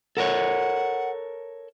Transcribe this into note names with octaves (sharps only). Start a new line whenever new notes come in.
A4 A#4 C#5 F#5